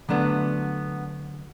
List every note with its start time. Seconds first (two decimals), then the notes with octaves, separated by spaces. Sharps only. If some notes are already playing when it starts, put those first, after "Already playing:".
0.09 D3 F#3 A3 B3 D4